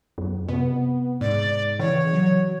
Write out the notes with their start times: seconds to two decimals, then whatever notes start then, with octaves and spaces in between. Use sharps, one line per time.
0.18 F#2
0.48 C3 B3
1.21 G#2 D5
1.79 C#3 E3 C#5
2.13 F#3